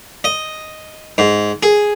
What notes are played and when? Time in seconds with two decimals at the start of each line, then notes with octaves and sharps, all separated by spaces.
0.24 D#5
1.18 G#2
1.63 G#4